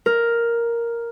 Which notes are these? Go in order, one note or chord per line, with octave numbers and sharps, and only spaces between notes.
A#4